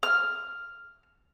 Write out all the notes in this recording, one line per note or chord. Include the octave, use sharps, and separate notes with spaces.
F6